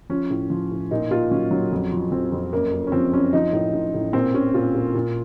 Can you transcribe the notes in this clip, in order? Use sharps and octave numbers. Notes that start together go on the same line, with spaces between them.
F3 C#4
A2
F3
A2
A#2 D#4
A#2 F4
F#3 C#4
F#3
F2
F3
F2 C4
F2
F#2 A#3
F#2
C#4
F3 C4
F#2 C#4
F3 D#4
A2
A2
A2
A#2 C4
A#2 C#4
A#2 F4
A#2
A#2